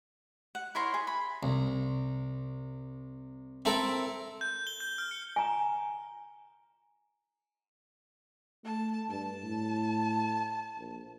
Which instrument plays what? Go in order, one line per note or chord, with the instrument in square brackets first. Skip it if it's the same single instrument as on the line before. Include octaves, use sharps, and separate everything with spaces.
[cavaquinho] F#5
E4 A#4 C#5 C6
G#4
B5
[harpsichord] C2
C4 E4 A4 A#4
[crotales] G6
G7
G6
F6
C#7
[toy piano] G#5 A#5
[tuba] A3 [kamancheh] A5
[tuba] G2 [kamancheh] A5
[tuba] A2
A#1